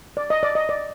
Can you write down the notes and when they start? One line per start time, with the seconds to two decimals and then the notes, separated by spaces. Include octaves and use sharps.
0.17 D5
0.30 D#5
0.43 D5
0.55 D#5
0.69 D5